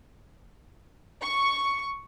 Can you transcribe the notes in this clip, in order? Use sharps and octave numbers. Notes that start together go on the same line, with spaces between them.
C#6